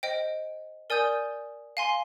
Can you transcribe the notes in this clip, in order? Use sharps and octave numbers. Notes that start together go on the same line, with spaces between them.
C5 D#5 G5
A#4 D5 G#5 D#6 G6
F5 G#5 C6